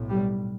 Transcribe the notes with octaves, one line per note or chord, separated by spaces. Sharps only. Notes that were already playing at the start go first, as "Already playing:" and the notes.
Already playing: B1 A2
G3